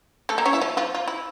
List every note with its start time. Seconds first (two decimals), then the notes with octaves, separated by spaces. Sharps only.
0.29 A3 A4
0.38 A#3 A#4
0.45 C#4 C#5
0.53 E4 E5
0.61 F3 F4
0.77 F3 F4
0.95 F4
1.08 E4